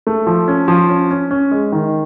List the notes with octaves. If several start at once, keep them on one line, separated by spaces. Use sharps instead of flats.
A3
F3
C#4
F3
C#4
C#4
C#4
G#3
D#3